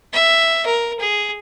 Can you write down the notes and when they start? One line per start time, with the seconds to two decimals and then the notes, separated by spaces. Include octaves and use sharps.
0.13 E5
0.66 A#4
1.00 G#4